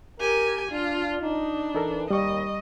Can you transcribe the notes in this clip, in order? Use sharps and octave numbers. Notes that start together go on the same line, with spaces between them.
G4 A#4 G#5
D4 F4
D4 D#4
E3 D#4 A4 A#4
D#2 G3 D#5 C#6